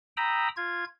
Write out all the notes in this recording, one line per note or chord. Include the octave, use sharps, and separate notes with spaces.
G5 A#5 B5 D#6 E6
F4 G#6